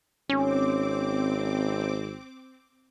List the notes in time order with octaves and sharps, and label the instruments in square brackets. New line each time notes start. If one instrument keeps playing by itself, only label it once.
[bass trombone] G#1 [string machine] C4 D6 [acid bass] C#4